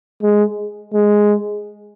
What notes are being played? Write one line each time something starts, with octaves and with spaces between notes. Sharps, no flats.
G#3
G#3